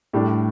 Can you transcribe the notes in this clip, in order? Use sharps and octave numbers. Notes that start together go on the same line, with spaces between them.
A2 G3 D4